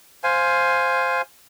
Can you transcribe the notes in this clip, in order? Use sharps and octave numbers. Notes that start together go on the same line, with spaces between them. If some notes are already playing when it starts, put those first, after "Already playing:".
C5 F5 G#5